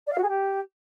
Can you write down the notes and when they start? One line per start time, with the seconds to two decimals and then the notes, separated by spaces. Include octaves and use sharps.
0.06 D5
0.12 F5
0.17 F#4
0.23 G#4
0.28 G4